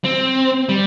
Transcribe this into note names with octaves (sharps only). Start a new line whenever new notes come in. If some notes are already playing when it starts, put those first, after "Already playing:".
C4
G3